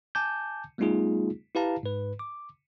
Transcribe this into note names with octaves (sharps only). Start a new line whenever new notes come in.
G#5 A5 D6 G6
G3 A3 B3 D#4 F4 G#4
E4 G4 B4 F5 A5 A#5
G#2 B4
D6